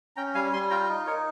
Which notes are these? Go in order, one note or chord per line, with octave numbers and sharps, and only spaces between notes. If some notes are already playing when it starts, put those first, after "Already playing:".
C#4 G5 A#5
G3 F5 G#5
G3 G#5 C6
F4 G5 A#5
D#4
D#4 A#4 C#5